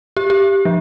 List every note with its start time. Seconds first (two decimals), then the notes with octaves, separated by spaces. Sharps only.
0.17 G4
0.30 G4
0.65 F3